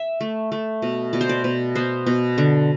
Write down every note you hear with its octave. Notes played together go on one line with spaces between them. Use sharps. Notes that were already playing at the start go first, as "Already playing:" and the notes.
Already playing: E5
A3
A3
B2
B2 D5
C5
D5
B2
B3 C5
B2
D3